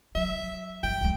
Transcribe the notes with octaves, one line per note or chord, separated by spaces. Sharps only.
F#3 E5
G1 G5
D2 G#3